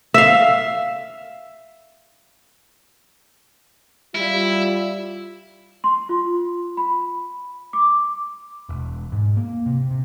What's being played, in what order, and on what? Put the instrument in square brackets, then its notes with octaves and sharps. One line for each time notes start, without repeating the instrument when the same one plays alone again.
[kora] E5 F5
[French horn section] G3 F4 [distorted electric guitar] E4
[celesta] C6
F4
B5
D6
[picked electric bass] E1
G#2
A#3
C3
C3